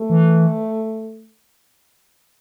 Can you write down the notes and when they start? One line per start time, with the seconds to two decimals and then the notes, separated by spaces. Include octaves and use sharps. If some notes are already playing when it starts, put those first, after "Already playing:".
Already playing: A3
0.10 E3